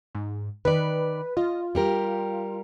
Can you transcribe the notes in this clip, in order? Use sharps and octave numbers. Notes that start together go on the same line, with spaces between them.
G#2
D#3 B4 D5
F4 D#5
G3 G4 A#4